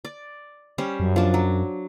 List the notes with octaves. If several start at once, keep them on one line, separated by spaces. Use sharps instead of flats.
D5
G3 C#4 C5
F#2
F3 D4
F#3